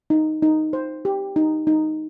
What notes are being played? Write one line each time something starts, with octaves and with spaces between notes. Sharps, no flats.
D#4
D#4
C5
G4
D#4
D#4